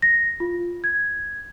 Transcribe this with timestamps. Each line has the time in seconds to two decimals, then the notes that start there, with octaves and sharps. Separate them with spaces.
0.02 A#6
0.40 F4
0.84 G#6